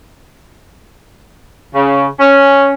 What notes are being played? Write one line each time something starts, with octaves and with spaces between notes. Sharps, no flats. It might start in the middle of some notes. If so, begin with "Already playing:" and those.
C#3
C#4